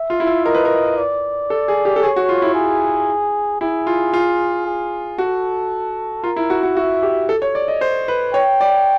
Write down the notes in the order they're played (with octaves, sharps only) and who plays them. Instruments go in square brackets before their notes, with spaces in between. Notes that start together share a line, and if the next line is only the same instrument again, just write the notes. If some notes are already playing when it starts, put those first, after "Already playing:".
Already playing: [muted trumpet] E5
[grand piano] F4
E4
F4
[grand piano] A#4 [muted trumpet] D#5
[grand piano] B4
A#4
[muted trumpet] D5
[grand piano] A4
G#4
G4
A4
[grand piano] G#4 [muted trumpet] C#5
[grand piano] F#4
F4
E4
[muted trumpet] G#4
[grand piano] E4 [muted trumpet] G#4
[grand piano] F4
F4
[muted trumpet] G#4
[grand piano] F#4 [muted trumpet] A4
[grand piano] F4 [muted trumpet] A#4
[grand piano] E4
F#4
F#4
[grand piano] F#4 [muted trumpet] E5
[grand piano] G4
A4
C#5
D5
D#5
C5
B4
[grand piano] C#5 [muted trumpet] G5
[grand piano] D5